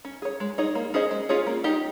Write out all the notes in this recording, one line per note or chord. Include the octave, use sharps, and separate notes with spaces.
C#4
G#4 C#5
G#3
D#4 G#4 C#5
A#3
C#4 G#4 C5 D#5
G#3
C#4 F4 G#4 C#5
A#3
D#4 G4